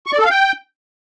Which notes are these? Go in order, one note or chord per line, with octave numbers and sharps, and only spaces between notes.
C#6
D5
A4
F5
G5